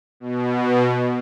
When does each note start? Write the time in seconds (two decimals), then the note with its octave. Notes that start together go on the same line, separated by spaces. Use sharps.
0.20 B2